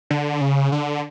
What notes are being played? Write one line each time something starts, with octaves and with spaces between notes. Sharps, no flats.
D3
C#3
D3